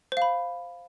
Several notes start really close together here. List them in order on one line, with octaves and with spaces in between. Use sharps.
C5 F5 B5